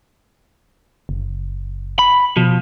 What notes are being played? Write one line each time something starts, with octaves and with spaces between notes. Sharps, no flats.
F#1
B5
B2 F3